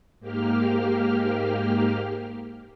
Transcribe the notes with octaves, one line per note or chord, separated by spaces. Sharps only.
G#2 A#3 G4 F6